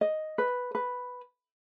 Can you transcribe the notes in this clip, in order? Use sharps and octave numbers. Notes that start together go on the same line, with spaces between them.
D#5
B4
B4